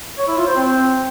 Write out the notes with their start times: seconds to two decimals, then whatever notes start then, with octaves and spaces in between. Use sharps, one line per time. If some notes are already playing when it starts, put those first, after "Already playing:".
0.18 C#5
0.28 E4
0.37 F4
0.47 C5
0.56 C4